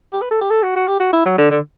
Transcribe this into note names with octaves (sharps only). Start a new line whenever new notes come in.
G4
B4
A4
G4
A4
F#4
F#4
G4
F#4
E4
F#3
D3
D3